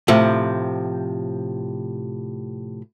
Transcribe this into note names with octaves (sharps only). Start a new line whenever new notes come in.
A2 C3 F3